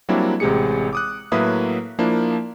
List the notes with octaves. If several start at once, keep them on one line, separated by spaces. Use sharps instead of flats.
F#3 G3 A#3 C4 D4 E4
A1 C3 G#3 G4 G#4 C#7
D6 D#6 F#6
A2 F#3 A#3 B4 E5 D#6
F3 A#3 D4 E4